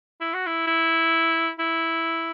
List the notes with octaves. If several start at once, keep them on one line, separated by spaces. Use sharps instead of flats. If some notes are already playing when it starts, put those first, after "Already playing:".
E4
F#4
E4
E4
E4